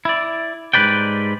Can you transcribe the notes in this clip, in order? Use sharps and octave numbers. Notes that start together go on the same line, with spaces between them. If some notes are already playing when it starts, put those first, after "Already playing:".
E4 D5
G#2 D#3 G3 B4 D5 G5